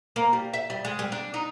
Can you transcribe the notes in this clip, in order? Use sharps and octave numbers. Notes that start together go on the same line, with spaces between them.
A#3
G3
E5
G3
G#3
G3
D4
D#4